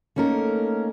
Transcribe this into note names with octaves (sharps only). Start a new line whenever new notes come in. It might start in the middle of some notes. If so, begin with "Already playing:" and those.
A3 A#3 C#4 D#4 A#4